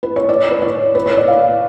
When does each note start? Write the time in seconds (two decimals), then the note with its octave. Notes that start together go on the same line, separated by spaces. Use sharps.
0.03 B4
0.16 C#5
0.29 D5
0.51 B4
0.62 C#5
0.95 B4
1.06 C#5
1.17 D5
1.28 F5